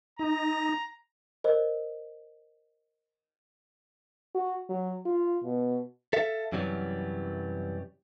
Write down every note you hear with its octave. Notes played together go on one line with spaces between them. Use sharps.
D#4 A#5
A#4 C5 D#5
F#4
F#3
F4
B2
A4 E5 F5
F#2 C3 E3 F#3 G3